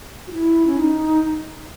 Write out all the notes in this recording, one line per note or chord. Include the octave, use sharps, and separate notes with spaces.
F#4
E4
C#4
D#4